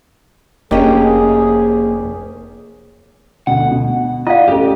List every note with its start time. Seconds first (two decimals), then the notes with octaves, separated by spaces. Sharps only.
0.71 F1 A#3 C#4 D4 G4 G#4 D#5
3.47 D2 B2 F#5
3.71 B2
4.27 F4 D5 D#5 F5 F#5
4.48 A1 A3 G4